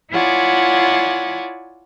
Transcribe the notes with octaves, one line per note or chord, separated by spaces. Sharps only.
E4 F4 C#5 D5 F#5 G#5